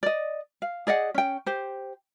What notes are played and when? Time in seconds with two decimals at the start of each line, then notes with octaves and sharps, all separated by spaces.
0.03 D5 D#5
0.62 F5
0.87 G#4 D5 D#5 F#5
1.14 C#4 G5
1.46 G4 C5